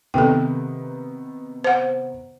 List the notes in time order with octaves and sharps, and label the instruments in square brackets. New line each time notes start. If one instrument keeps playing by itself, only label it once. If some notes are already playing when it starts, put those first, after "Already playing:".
[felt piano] C3 D#3 B3 [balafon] A4 G5
[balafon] C5 F#5